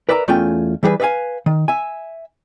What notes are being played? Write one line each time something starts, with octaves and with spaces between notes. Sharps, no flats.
A#4 B4 D5 E5 G#5 A#5
E2 A3 C#4 F4 G5 G#5
E3 G3 G4 G#4 B4
B4 D5 E5 F5 G#5
D#3
E5 G#5